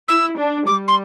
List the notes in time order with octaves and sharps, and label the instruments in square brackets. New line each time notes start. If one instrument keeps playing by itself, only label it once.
[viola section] E4 [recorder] E6
[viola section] D4
[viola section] G3 [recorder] D6
[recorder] C6